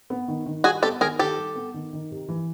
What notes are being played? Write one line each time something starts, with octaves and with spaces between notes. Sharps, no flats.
B3
D#3
D#3
G3 F#4 G#4
B3 G4 A4
D#3 G#4 A#4
D#3 G4 A4
G3
B3
D#3
D#3
C3
E3